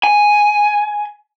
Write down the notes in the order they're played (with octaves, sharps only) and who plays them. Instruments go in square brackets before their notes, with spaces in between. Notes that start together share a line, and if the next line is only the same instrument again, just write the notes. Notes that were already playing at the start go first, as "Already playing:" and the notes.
[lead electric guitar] G#5